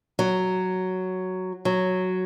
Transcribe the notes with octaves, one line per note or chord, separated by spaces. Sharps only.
F#3
F#3